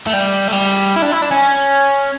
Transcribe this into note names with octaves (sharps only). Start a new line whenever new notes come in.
A3
G3
A3
G3
E4
D4
E4
D4
C#4